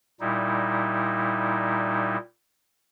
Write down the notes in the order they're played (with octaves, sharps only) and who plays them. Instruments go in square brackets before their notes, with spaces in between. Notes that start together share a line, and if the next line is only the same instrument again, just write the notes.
[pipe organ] A#2 G3 D#4 E4